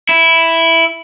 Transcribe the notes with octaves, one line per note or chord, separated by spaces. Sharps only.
E4